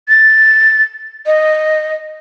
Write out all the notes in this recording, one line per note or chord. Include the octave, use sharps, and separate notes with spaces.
A6
D#5